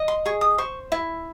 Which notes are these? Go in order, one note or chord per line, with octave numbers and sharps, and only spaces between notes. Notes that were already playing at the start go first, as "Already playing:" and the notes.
Already playing: D#5
C6
G#4 C#6
D#6
C5 C#6
E4